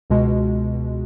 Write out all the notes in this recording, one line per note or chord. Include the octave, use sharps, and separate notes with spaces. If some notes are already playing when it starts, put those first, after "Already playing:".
C#2 B2 G#3